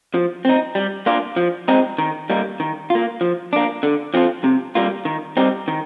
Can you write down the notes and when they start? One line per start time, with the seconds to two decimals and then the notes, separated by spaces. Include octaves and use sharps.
0.14 F3
0.45 C4 D#4
0.75 G3
1.06 A#3 D4 F4
1.36 F3
1.68 G#3 C4 D#4
1.98 D#3
2.30 G3 A#3 D#4
2.60 D#3
2.90 A#3 F4
3.21 F3
3.53 A#3 D4
3.83 D3
4.14 F3 C4 F4
4.44 C3
4.75 G3 A#3 F4
5.05 D#3
5.37 G3 C4 D#4
5.68 D#3